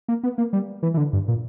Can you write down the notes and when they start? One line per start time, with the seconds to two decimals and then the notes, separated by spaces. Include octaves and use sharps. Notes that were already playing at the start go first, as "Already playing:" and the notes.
0.08 A#3
0.23 B3
0.38 A#3
0.53 G3
0.83 E3
0.94 E3
0.97 D3
1.13 G2
1.28 A#2